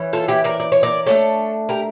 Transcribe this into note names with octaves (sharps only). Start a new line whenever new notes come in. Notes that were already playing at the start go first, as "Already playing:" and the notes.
Already playing: E3 C#4
F4 A4
E4 G4
A#4 D5
D5
C#5
A#4 D5
D3 A3 D4 A4 C#5
G4 A#4